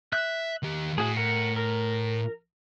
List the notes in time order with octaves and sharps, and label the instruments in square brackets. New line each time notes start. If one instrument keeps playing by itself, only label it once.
[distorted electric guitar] E5 [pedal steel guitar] F#6
[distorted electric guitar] D#3 G4
[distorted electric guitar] A2 [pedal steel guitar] F#4 G#4
[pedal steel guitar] A#4 F#5
A#4